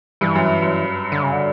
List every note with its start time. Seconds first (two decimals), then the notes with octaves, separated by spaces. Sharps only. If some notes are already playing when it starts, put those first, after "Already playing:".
0.21 G2 E3
0.35 F#2
0.62 F#2
1.12 D3
1.23 C#3
1.33 D3